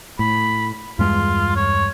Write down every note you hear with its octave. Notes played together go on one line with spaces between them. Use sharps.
A2 B5
E2 G2 G#3 F4
C#5